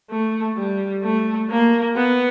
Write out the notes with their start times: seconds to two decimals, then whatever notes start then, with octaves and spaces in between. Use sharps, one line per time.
0.11 A3
0.57 G3
1.04 A3
1.50 A#3
1.97 B3